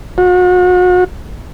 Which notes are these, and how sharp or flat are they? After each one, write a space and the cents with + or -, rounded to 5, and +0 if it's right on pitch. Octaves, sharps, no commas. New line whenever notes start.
F#4 -40